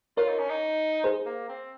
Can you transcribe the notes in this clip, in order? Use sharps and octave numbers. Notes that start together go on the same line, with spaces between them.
F4 A#4 C#5
D#4
C#4
D#4
G#4 C5
A#3
C4